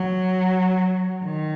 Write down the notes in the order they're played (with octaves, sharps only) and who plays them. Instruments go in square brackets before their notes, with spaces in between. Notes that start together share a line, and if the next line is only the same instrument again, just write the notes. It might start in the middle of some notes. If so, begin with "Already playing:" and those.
Already playing: [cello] F#3
D#3